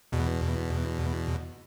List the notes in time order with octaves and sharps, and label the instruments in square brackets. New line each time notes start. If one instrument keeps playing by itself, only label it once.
[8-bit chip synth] E2 B2